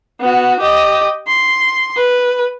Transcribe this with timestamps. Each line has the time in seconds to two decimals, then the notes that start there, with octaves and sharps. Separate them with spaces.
0.20 B3 F#4
0.60 G4 D#5
1.27 C6
1.97 B4